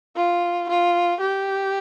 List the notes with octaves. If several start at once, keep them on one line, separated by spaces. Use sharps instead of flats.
F4
F4
G4